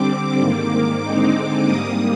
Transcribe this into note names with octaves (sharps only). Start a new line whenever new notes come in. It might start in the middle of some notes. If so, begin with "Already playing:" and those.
Already playing: D3 G3 C4 D6
G#2 D#3 A#3
D3 G#3 C4 D#4
G#2 G3 A#3 D#6